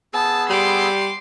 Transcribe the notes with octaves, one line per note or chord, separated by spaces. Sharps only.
B3 G#4 A5 E6
G3 C6 D6